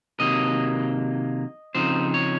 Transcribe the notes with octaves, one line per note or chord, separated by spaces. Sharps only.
C3 D#3 F#3 A#3 D#5
C#3 F3 C4 D#4 C5
C#5